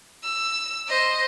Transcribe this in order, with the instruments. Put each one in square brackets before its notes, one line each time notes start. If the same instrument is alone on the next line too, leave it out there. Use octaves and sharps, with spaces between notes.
[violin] E6
C5 D#5